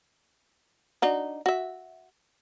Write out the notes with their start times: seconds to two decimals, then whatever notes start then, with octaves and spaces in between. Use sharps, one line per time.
1.02 D4 D#4 F#4
1.46 F#4 E5